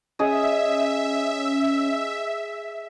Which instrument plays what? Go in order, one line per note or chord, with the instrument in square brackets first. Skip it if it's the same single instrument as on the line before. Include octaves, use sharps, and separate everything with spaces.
[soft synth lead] C#4 [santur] G#4 D#5 [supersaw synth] E5